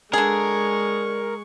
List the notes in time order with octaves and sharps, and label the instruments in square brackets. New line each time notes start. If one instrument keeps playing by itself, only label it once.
[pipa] D3 G#4 [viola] G#3 C#6 [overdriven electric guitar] A#4